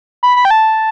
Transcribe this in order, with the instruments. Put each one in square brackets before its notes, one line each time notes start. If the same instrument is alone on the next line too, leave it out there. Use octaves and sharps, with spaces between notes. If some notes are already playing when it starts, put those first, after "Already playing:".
[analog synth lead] B5
B5
G5
A5